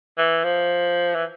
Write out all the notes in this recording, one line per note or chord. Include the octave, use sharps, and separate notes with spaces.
E3
F3
E3